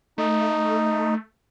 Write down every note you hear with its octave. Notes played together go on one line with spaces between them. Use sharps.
A3 D#4